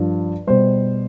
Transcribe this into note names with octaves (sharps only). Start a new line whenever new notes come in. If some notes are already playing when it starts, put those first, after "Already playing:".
Already playing: G2 F3
B2 G3 C5